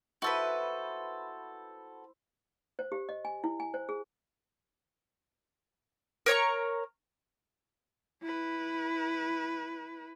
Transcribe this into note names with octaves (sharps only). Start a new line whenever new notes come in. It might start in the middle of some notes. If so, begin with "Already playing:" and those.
E4 F#4 A4 B4 C5
C5
G4
D#5
G#5
E4
G#5
C5
G#4
A#4 C#5 A#5 C#6
E4 B4